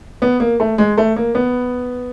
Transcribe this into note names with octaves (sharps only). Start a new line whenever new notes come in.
B3
A#3
A3
G#3
A3
A#3
B3